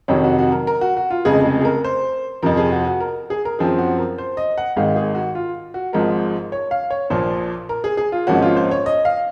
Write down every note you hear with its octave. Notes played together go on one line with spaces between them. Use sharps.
F2 C3 D#3 F#3 C#5
F#4
F#4
A#4
A#4
F#4
F#4
F4
F1 F2 C#3 G#3 G#4
G#4
G#4
A#4
C5
F2 C3 F3 A#4
G#4
F#4
F#4
A#4
G#4
A#4
F#2 F3 C4 G#4
F#4
A#4
C5
D#5
F#5
G#1 G#2 D#3 G#3 F5
G#4
F#4
F4
F#4
G#1 G#2 F3 G#3 A#4
C#5
F5
C#5
A#1 A#2 F3 A#3 C5
A#4
G#4
G#4
F4
G#1 G#2 F3 A#3 C#4 F#4
F4
C5
C#5
D#5
F5